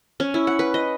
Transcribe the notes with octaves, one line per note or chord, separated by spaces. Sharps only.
C#4
E4
F#5
B4
D#5